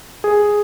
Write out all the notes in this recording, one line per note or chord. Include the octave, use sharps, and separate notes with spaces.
G#4